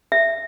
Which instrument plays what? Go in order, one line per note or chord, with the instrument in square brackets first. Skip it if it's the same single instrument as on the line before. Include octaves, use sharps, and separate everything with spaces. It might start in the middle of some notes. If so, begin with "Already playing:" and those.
[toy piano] E5